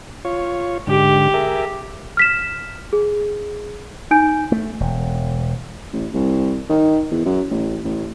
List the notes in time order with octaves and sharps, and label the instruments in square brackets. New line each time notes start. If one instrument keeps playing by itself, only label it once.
[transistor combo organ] F4 C#5
[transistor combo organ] G#2 D3 [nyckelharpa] G4
[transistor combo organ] G#4 A#4 E5
[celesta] F6 B6 E7
G#4
D#4 G#5 G6 D7
[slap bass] A3
E1
[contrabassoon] A1
C2
D#3
E2
F#2
A1
A1